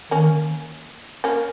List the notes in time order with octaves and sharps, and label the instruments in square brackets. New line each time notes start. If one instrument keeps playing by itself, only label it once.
[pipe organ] D#3 [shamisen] A#3 C#4
[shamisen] A#3 C#4